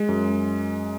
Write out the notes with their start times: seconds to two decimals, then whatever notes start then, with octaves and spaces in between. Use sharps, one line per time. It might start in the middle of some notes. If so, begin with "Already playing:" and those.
Already playing: G#3
0.09 F#2